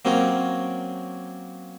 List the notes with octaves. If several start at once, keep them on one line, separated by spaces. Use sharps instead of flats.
F#3 A#3 C4 C#4 G#4 A#4